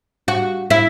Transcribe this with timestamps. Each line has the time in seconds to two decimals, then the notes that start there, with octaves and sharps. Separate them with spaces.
0.28 F#4
0.70 E4